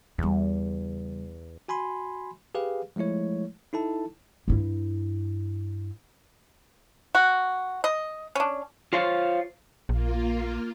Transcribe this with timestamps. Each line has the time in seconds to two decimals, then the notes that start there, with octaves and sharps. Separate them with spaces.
0.18 E2 C#3 G3
1.68 F#4 G#5 B5 C6
2.55 G4 G#4 B4 F5
2.96 F3 G#3 A3 E4 C#5
3.73 D#4 E4 A4 A5
4.48 G2 E4
7.15 F#4
7.84 D#5
8.35 C#4 D4
8.93 F4 C5 C#5 F5
9.89 A#1 A#3 F4